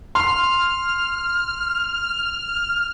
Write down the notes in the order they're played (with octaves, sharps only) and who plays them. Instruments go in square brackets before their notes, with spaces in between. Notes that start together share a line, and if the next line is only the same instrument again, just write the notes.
[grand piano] C6 [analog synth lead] F6